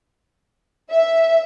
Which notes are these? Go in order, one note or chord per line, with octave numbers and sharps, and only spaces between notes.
E5